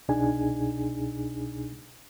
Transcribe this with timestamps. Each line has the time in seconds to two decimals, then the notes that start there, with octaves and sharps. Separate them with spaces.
0.08 C2 B2 D4 D#4 G#4 G#5